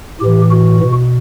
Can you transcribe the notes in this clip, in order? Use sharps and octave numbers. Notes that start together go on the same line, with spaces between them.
A2 E3 G4
F#4
B2